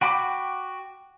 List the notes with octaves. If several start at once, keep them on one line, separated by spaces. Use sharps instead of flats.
F#4 G5 B5 D6